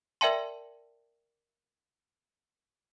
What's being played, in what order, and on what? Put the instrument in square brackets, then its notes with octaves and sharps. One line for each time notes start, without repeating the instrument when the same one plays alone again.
[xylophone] A#4 D5 E5 G5 A5 C6